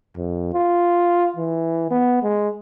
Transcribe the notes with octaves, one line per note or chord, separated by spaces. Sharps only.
F2
F4
E3
B3
G#3